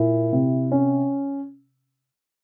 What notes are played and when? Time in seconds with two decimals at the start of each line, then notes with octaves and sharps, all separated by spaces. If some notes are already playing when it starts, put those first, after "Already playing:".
Already playing: A#2 E4
0.33 C3
0.72 C#4